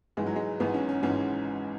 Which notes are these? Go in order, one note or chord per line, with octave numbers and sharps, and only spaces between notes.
G#1 G#2 E3 G#3
F#3
G#3
G#1 G#2 E3 B3
C#4
C#4
G#1 G#2 E3 C#4